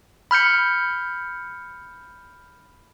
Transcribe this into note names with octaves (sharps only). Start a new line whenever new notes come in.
B5 F6 G6 C#7